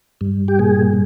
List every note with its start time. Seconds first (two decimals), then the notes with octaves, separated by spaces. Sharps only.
0.21 G2
0.48 G4
0.59 A#2 G#4